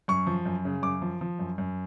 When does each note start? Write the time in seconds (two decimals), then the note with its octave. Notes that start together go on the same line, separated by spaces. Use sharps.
0.08 F#2 C#6
0.27 F3
0.45 F#2
0.65 C#3
0.83 F#2 D6
1.02 F3
1.21 F3
1.39 F#2
1.58 F#2